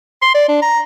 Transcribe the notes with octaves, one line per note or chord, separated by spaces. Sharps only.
C6
D5
D4
A#5